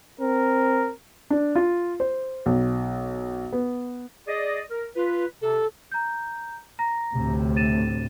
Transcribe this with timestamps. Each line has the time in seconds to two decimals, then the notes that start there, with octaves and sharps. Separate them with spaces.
0.20 C4 A#4
1.30 D4
1.55 F4
2.00 C5
2.46 B1
3.52 B3
4.27 G#4 D5 D#5
4.70 A#4
4.96 F4 B4
5.42 C3 A4
5.92 A#5 G6
6.79 A#5 A#6
7.14 D2 A2 C3
7.56 A6 D#7 E7